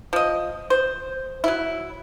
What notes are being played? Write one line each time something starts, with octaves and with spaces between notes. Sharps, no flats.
F3 D#5
C5
F#3 E4